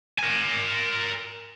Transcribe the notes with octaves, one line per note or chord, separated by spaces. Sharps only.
A#4 G#5